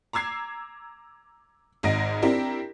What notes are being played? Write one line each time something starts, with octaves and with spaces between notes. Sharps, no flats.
A#5 D6 E6 G#6 C7
G#1 G#2 D#5 A#6 D7
C4 D4 E4 G4 A#4